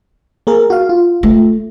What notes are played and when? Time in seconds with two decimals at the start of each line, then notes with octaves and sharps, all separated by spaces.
0.47 A#3 G#4 A#4
0.70 F#4 F5
0.89 F4
1.23 A3